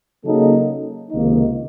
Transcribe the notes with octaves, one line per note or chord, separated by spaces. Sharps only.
C#3 F#3 A#3 D#4 A4
C#2 C3 D#3 A#3 D#4